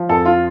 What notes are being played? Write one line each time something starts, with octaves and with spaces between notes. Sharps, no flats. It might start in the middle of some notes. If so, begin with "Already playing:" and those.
Already playing: F3
F2 A4
F4